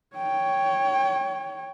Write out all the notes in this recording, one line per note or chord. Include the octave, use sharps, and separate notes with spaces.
C#5 G5